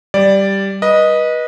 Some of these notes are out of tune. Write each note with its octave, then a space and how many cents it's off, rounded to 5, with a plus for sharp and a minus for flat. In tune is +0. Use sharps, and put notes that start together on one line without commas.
G3 +0 D5 +0
B4 -25 D#5 +0